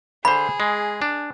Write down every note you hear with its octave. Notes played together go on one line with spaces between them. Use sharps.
D3 G#4 C5 B5
G#3
D4